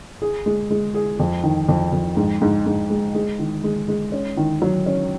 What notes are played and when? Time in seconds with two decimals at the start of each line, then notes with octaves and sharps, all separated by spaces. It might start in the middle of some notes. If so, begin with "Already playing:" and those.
0.22 G#4
0.46 G#3
0.70 G#3
0.95 G#4
1.19 F2
1.44 D#3
1.69 F2
1.93 F2
2.17 G#2
2.42 G#2
2.67 G#2
2.90 G#3
3.15 G#3
3.39 D#3
3.64 G#3
3.88 G#3
4.12 C#4
4.37 D#3
4.62 F#3
4.86 C#4